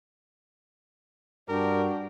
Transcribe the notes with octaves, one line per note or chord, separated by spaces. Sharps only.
G2 D4 F#4 A#4 G5